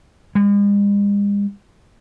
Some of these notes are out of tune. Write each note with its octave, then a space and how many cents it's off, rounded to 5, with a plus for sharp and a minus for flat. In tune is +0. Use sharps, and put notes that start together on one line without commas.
G#3 -45